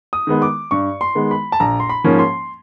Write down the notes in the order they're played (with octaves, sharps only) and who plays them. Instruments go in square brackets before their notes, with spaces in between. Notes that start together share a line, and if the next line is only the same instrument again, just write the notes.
[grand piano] D#6
D#3 G#3 B3
D6
G2 C#6
C6
D#3 G#3 B3
B5
A5
A#1 A#5
C6
B5
G#2 F3 A#3 C#4
C6